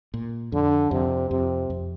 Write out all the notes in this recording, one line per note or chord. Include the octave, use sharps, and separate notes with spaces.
A#2
F2 D3
F2 C3
F2 C3
F2